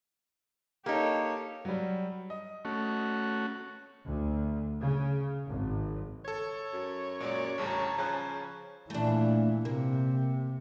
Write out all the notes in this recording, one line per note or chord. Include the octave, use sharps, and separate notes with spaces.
A#3 D#4 G4 A4 C#5
F#3 G3
D#5
A3 C#4 F#4
D2
C#3
G#1
A4 C#5 G#6
F#2
A#2 F#3 G#3 D5
A1 D2 C#3 G3 A5 A#5
C#3 F3 C#4 C5 F#6
A#2 E3 A3 D4
C3 A#3